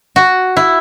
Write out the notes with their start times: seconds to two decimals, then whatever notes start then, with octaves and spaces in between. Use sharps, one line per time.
0.16 F#4
0.57 E4